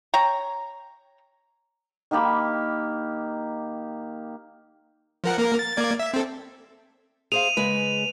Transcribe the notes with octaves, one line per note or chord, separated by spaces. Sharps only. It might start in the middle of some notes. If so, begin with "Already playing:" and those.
C#5 G5 A#5
D#3 A#3 G4 B5
F3 A#4 F#5
A#3 A#4
A6
A#3 D5 G#6
E5
C4 A4
G#4 C5 F5 D#7 F7
C#3 G#3 B4